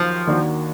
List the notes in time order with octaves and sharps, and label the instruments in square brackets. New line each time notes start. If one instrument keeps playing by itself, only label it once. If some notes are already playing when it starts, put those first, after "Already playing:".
Already playing: [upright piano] D#2 D#3 F#3 [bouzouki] F3
[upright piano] D#2 D#3 A#3 D4 F#4